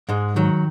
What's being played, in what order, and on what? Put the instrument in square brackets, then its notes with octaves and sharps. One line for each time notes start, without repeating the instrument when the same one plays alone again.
[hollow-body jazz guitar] G#2 G#3
D#3 F#3